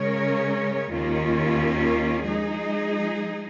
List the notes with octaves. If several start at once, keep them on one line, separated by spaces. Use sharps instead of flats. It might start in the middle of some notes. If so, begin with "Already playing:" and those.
Already playing: C#3 G#3 C#4 A#4 C#5
D#2 D#3 A#3 C#4 F4
F3 G#3 D#4 G#4